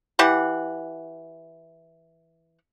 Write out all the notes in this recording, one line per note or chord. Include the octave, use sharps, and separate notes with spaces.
E3 G4 F#5